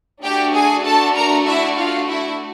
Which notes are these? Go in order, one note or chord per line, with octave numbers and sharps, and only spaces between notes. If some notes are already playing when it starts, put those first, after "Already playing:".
A3 D4 F#4 G4 G5
G#4 G#5
A4 A5
A#4 A#5
E4 E5
F4 F5
E4 E5